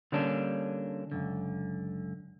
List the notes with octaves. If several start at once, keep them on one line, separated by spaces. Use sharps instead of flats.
D3 G3 A#3 C#4 D4
C#2 F#2 D3